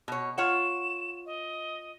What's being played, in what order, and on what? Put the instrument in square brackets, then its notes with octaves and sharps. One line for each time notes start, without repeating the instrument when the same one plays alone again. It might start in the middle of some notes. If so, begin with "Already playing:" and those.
[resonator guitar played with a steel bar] B2 C#5
[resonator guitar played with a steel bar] F4 C#5 F#5 [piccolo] E7
[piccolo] D#5